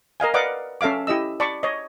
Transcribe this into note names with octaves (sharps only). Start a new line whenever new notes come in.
A#4 D#5 F5 G#5
B4 D5 D#5 F5 F#5 D6
C#4 A4 E5 F5 D6
E4 G4 D#5 E6
D5 A5 B5 C#6
C#5 D#5